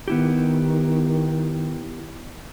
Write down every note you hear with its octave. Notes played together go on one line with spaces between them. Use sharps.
D#3 B3 E4 G4